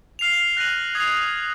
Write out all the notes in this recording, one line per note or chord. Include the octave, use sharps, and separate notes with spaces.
F6 C7 F7
F#6 A#6 D#7 F#7
D#6 G#6 C7 F7